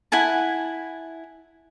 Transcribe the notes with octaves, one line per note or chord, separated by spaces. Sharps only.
E4 F#5 G#5 A5